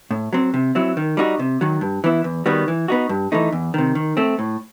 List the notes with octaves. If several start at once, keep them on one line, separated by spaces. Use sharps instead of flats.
A2
F#3 C4
C3
F#3 C4 E4
D#3
G3 D#4 F#4
C3
D#3 F#3
G2
E3 B3 E4
E2
D#3 G3 B3 F#4
E3
B3 D#4 F#4
G2
E3 A3 D#4
E2
C3 D#3
D#3
A3 C4
A2